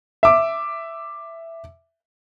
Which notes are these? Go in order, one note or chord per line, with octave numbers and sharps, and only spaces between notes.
E5 D6